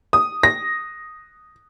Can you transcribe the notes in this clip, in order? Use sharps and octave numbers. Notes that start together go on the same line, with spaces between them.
D#6
A#6